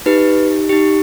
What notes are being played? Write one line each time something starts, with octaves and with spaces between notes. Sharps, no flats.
D#4 G4 B4
D#4 G4